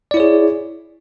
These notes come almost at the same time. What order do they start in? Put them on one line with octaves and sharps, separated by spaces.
D5 E4 C#5 G#4